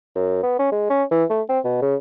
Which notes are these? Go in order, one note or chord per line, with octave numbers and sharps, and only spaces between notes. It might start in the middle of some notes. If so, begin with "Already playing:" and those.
F#2
B3
C#4
G#3
C#4
E3
A3
C4
B2
C#3